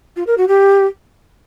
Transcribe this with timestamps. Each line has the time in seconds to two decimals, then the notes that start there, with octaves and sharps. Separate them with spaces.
0.16 F4
0.27 A#4
0.37 F#4
0.48 G4